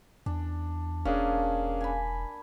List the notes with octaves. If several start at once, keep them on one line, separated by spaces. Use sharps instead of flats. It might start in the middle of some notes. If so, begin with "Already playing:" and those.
E2 D4
E1 A#3 C#4 D4 G#4 F5
G#5 B5